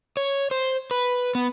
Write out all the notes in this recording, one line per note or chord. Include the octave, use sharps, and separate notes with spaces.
C#5
C5
B4
B3